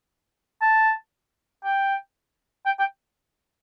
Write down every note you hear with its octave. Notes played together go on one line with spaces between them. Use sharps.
A5
G5
G5
G5